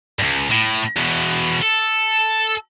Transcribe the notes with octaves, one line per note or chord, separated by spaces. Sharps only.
C#2 G2
A2
E2 B2
A4